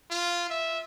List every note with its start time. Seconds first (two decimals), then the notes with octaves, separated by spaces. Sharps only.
0.11 F4
0.50 E5